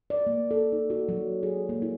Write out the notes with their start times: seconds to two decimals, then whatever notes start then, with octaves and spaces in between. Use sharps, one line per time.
0.10 D5
0.27 A#3
0.51 A4
0.72 D#4
0.90 F#4
1.09 F#3
1.43 G#4
1.69 A#3
1.82 E4